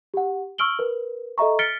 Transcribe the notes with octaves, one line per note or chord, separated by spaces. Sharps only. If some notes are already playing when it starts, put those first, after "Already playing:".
G4 F#5
C#6 E6 F6 D7 F#7 G7
A#4 B4
A4 D#5 E5 A#5 C#6
F6 A6 B6 C#7 D7 G7